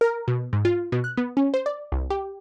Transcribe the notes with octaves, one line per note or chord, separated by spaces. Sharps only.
A#4
B2
G#2
F4
B2
F#6
B3
C#4
C5
D5
C2
G4